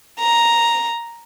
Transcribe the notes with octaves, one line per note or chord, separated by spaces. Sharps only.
A#5